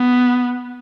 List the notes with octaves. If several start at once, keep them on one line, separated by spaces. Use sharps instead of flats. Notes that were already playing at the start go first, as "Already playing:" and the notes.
Already playing: B3